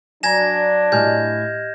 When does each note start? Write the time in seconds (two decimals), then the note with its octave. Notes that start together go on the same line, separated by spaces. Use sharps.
0.23 F#3 D4 G#5 A#5 G#6 A#6 E7
0.92 A2 G4 D#5 G#5 F6 G6